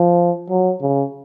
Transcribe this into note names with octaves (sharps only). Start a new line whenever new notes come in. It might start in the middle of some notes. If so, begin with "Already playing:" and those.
Already playing: F3
F#3
C#3